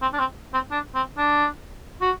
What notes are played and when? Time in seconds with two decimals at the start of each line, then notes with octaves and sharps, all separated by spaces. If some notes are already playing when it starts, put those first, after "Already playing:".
0.02 C4
0.13 D4
0.19 C4
0.54 C4
0.71 D4
0.94 C4
1.18 D4
2.01 F#4